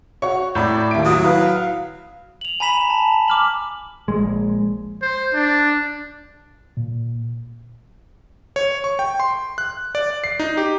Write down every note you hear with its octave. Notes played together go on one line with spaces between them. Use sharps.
F#4 C#5 C#6
A2 D5 B5 G6
D#2 E5 D7
F#3 D#6
E4 B4 F5
F7 F#7
G#5 A#5 B5 B6 E7 F#7
A5
D6 F6 F#7
A#1 G#3
C5
D4
A#2
C#5
C#6
G5
C6
F#6
D5
C7
D#4
G4